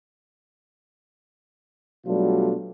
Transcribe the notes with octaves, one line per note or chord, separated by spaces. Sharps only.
B2 F#3 G3 A3 D4 F4